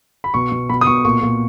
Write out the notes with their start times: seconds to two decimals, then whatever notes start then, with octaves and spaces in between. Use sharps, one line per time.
0.24 B5
0.34 B2 C#6
0.52 B2
0.69 B2 B5
0.81 D#6
0.87 B2 C#6
1.05 A#2 C#6
1.23 A#2